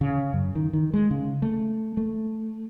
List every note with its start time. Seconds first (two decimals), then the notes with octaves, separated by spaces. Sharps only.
0.01 C#3
0.33 F#2
0.55 D#3
0.73 D#3
0.94 G#3
1.11 C#3
1.42 A3
1.97 A3